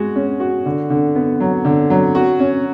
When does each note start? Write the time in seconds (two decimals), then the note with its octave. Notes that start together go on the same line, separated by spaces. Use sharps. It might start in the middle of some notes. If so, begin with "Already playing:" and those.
Already playing: G#3 F#4
0.16 C#4
0.40 F#4
0.66 D3
0.90 D3
1.15 B3
1.40 F#3
1.65 D3
1.90 F#3
2.15 F#4
2.40 C#4